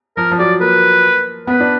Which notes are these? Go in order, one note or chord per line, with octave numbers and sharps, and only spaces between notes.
F3 A#4
F3
F#3 D5
A#3 B4
B3 B4
D4